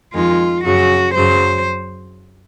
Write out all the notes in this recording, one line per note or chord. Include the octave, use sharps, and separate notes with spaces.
F2 D#3 G#3 F4
F#2 C#3 F#3 F#4
F#2 C#3 F#3 C5